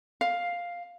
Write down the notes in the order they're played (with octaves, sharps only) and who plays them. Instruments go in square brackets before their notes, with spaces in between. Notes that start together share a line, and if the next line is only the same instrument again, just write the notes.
[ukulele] F5